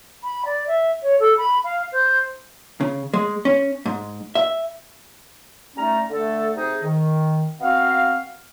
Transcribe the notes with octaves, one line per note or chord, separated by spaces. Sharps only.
B5
D5
E5
C#5
A4
B5
F5
C5
C#3
G#3
C#4
G#2
E5
G3 A3 C#4 D#4 A#5
D3 A3 A4
C3 D#4 G#4
D#3
B3 C4 F#4 F5